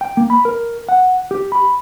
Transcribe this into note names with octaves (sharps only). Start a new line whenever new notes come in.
G5
A#3
B5
A#4
F#5
G4
B5